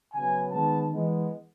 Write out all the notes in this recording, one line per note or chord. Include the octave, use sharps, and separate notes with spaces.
C#3 F#3 B3 G#5
D#3 G#3 B3 A5
E3 G#3 B3